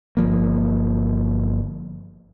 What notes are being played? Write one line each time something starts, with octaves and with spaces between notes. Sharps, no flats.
G1 F3 A#3